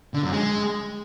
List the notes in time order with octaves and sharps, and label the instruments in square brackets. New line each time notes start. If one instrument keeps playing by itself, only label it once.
[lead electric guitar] D3
F#2
G#3